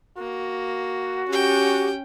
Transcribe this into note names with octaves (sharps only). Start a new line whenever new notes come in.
A#3 F#4
C#4 G4 G5